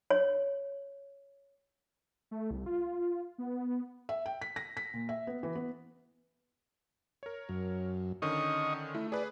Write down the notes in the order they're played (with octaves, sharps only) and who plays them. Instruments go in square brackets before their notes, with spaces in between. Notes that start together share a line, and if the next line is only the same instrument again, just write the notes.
[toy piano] C#5
[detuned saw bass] A3
C2
F4
B3
[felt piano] E5
G5
B6
A#6
B6
A#2
E5
B3
E3
B3
[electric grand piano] A#4 C#5
[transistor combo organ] F#2
[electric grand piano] D3 D#3 C#4 [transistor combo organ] D#5 C#6 D#6
[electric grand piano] A3 [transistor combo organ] E4
[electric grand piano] G#4 B4 [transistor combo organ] D5